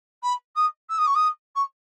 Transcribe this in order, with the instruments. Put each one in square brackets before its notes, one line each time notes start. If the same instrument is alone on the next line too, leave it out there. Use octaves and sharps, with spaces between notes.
[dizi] B5
D#6
E6
D#6
C#6
D#6
C#6